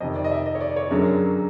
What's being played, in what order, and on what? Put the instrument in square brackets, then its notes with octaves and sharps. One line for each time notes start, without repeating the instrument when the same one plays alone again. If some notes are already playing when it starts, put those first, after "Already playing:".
[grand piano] F2 C3 D#3 D#5
D5
D#5
E5
D#5
C#5
D5
C#5
F#2 D3 F#3 A#3 G#4